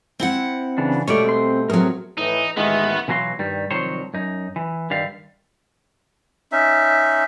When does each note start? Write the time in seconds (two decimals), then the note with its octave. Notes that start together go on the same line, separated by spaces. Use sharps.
0.19 C4 E4 F#5
0.78 C#3 E3 D4
1.08 B2 G3 A3 C#5 D5
1.25 C4 C6
1.70 A2 F#3 C4 G#4 A#4
2.18 A2 E3 D#4
2.57 A1 D#3 G#3 B3 E5
3.08 B2 E3 F#3 F#4 F5 C6
3.39 G2 D#3 G3
3.71 C2 D#3 F3 F#3 C5 C#5
4.14 F#2 D#4
4.56 E3
4.90 G2 D3 D#3 G3 F5
6.52 C#4 D#4 E5